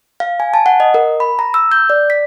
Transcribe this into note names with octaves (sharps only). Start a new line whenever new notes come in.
F5
G#5
A5
F#5
D#5
A#4
B5
A#5
E6
G6
D5
B6